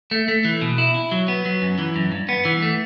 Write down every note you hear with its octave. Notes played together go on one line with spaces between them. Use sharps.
A3
A3
E3
B2
E4
E4
F#3
B3
F#3
F#2
E3
F#2
G2
B3
E3
A3